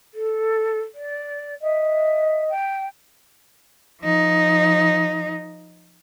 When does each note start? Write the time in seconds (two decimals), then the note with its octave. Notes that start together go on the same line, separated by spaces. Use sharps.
0.13 A4
0.94 D5
1.61 D#5 E5
2.49 G5
4.02 F3 D#4